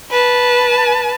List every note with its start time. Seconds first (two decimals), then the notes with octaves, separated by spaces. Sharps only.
0.11 B4 A5